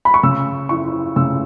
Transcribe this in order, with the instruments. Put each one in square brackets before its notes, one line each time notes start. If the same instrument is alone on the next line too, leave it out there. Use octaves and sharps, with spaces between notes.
[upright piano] B5
C#6
C#3 E6
E4 C#6
C#3 E6